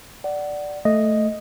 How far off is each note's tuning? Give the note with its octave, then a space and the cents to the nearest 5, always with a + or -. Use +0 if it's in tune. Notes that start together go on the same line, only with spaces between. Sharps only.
D5 +0 F#5 +15
A3 +0 D#5 +0